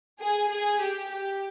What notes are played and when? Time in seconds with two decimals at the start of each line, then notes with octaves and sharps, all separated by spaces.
0.21 G#4
0.51 G#4
0.81 G4
1.11 G4